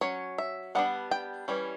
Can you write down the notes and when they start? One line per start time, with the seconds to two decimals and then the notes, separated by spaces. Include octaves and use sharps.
0.01 F#3 C#4 C#5
0.38 E5
0.75 G3 B3 D4 F#5
1.11 G5
1.48 E3 G3 C#4